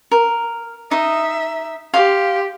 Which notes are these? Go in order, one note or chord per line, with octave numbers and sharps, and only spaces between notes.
A#4
D#4 D#5 E5
G4 F5 C6